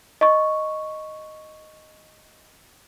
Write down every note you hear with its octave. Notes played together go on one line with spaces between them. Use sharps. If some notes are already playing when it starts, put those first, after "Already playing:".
D#5 C#6